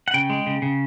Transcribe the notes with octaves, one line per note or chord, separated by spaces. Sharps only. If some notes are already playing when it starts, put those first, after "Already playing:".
F#5
C#3 G5
G#3
C#3
C#3